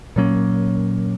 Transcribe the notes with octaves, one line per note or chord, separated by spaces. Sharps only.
A#2 F#3 A#3 C#4